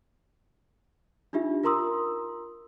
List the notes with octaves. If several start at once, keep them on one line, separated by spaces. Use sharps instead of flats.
D4 D#4 F4 G4 E5
F4 A#4 A#5 C6 D#6 E6